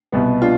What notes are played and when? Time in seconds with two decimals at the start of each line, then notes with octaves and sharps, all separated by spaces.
0.12 C2 B2 B3
0.42 D4 F4